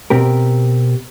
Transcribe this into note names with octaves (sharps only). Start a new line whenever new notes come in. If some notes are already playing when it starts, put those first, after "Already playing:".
B2 C4 G4 A#4